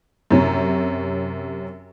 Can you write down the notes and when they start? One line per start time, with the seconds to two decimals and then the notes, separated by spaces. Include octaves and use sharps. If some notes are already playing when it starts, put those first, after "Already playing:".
0.31 F#2 C3 C#4